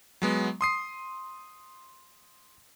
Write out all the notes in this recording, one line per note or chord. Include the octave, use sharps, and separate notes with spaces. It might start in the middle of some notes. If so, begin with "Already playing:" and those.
F#3 G#3 B3
C6 D#6 C7